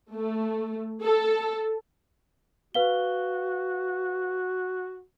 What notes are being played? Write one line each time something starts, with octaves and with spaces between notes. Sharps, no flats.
A3
A4
F#4 B4 F5 G7